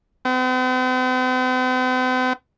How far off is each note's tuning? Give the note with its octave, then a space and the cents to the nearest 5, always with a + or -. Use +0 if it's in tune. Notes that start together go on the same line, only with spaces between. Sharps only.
C4 -45